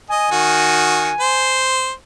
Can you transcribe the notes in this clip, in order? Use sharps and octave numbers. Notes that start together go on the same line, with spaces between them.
D#5 G#5
D#3 F#4
C5